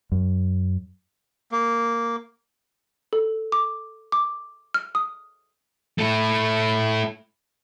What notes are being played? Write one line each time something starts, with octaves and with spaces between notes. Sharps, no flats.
F#2
A#3
A4
D6
D6
F6
D#6
A3 E4